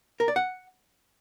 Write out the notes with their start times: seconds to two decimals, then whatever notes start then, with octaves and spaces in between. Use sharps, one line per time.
0.20 A#4
0.28 D5
0.36 F#5